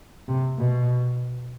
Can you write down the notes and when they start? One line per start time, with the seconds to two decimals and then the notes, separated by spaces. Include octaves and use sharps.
0.28 C3
0.59 B2